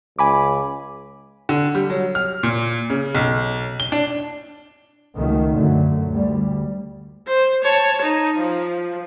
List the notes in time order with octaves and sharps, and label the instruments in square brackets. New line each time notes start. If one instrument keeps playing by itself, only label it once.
[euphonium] C#2 [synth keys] G#5 B5 D6
[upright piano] D3
G3
F#3
F6
A#2
C#3
B1
G7
D4
[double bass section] C#2 D#3 F#3 A3
F#2 D3 F#3 A3
D2 G3
[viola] C5
C#5 A5
D#4
F3